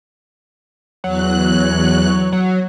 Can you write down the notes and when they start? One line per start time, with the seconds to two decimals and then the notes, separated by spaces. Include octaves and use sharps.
1.04 E2 F#3 F#6
2.32 F#3